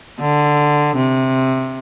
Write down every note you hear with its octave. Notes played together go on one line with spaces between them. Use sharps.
D3
C3